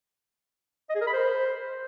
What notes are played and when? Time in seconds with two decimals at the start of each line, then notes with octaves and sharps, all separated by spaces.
0.90 D#5
0.95 G#4
1.01 A#4
1.07 B5
1.13 C5